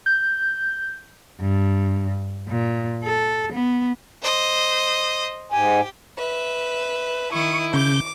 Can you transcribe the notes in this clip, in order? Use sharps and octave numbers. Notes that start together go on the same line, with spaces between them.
G6
G2
A#2
A4
B3
C5 D#5
G#2 G4 G#5
B4 E5
D#3 E4 C#6 D#6
C#3 D6 G6